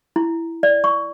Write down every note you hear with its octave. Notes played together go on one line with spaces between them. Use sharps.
E4
D5
C#6